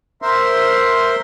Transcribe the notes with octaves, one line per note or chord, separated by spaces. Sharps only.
A#4 C5 E5 C6